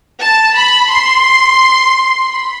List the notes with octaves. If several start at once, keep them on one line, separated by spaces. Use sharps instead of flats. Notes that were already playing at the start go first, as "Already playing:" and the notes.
A5
B5
C6
B5